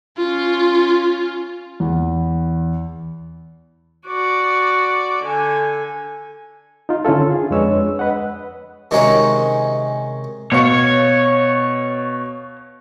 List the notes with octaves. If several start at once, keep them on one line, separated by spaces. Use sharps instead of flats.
C#4 F4
E2
F#4 D5
D3 G#5
D#4 F4
D3 C#4 E4 F4 A4
G#4
F2 G#3 D4 B4 C#5 E6
B4 D#5 F#5
C3 D#3 G#3 C#4 F#4 A#5
B2 C#5 F5 C#7